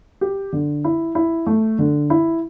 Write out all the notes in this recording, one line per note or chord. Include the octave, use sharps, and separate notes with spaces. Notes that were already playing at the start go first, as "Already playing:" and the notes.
G4
D3
E4
E4
A3
D3
E4